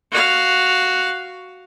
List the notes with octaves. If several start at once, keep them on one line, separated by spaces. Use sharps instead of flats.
F#4 F5